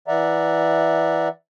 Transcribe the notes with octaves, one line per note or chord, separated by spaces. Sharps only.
E3 D5 E5 F#5 A#5